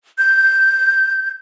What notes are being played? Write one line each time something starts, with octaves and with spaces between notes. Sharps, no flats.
G6